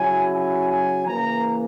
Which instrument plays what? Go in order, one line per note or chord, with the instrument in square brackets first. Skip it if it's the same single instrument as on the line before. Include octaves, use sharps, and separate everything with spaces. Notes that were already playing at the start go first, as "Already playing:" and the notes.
Already playing: [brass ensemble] C#3 F#3 C#4 E4 G#5
G#5
G#5
C#3 E3 A#3 A#5